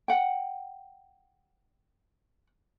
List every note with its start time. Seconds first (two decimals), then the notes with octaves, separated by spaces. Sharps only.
0.08 F#5 G5